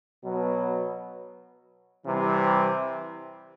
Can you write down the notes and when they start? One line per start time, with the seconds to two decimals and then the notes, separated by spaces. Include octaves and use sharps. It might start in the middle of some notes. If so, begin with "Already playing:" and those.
0.23 B2 F#3 B3
2.05 C3 E3 G3